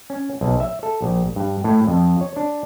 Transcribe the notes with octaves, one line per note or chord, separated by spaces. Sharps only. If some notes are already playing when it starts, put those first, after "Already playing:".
C#4
B1
E5
A4
A#1
G2
A2
F2
C#5
D4